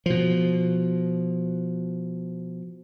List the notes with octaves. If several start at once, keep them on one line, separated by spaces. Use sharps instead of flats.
B2 F3